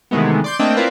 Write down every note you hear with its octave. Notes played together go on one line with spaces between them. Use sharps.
C3 D#3 E3 G#3 A3 B3
D5 C6 G6
A3 A#3 C4 D4 D#5 G5
C4 E4 F4 A#4 B4 D5